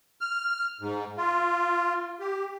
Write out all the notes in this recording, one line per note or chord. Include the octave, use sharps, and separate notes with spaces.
F6
G#2
F4
G4